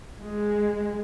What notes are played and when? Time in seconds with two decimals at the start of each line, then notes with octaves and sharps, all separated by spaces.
0.22 G#3